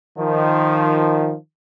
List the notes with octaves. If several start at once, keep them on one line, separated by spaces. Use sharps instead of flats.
D#3 F3